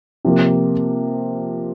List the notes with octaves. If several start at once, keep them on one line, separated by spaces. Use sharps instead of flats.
C3 F3 A#3